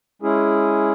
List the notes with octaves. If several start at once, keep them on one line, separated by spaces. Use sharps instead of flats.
G#3 C#4 E4 G#4